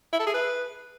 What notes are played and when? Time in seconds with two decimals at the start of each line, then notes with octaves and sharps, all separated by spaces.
0.12 E4
0.20 A4
0.27 G#4
0.34 B4